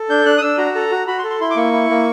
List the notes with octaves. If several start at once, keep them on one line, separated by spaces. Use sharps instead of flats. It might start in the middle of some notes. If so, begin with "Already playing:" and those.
Already playing: A4
D4 G6
D4 F#6
D#6
D4 E6
F#4 A#5
A4 A#5
F#4
F#4 B5
C6
A4
C6
E4 C6
D6
A#3 C#6
E4
A#3